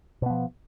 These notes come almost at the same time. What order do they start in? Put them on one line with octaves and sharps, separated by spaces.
B2 B3 F3